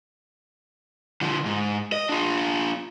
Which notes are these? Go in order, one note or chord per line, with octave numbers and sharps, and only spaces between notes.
D3 F3
G#2
D#5
D4 F4